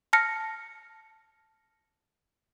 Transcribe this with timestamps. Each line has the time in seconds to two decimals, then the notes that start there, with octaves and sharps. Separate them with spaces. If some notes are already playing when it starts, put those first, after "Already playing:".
0.13 A5 F6 A#6 C#7